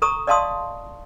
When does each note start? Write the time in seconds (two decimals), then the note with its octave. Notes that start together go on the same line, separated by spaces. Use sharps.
0.02 A4 A#5 C#6 D#6
0.27 D5 D#5 F5 A5 C6 D#6